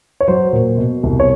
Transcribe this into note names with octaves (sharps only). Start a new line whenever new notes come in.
C#5
F#3 C5
A#2
B2
C2
C#5